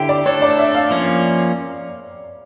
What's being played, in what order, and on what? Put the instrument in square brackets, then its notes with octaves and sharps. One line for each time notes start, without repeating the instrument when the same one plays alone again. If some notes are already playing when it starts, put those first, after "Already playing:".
Already playing: [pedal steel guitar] D3 E4 G4 [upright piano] G5
[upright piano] D5
[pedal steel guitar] A3 D4 A4 [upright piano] C#5
[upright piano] D5
E5
F5
[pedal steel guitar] F3 A#3 C#4